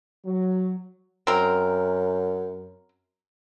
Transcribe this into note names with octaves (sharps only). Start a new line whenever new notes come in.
F#3
F#2 C4 A#4